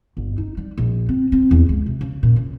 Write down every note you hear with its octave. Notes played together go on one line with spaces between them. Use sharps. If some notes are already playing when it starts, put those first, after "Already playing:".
G1
D#4
G3
A#1
C4
C4
E2
C#2
C3
C#3
A#2
C#3